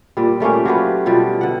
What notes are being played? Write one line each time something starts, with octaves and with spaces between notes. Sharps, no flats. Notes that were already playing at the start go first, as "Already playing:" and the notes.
A#2 G3
G3 A3 A#3 C#4
F#3 F4 G4 B4
B2 F3 G3
D3 F#5